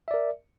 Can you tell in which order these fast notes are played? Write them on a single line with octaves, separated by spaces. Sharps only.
E5 D5 A#4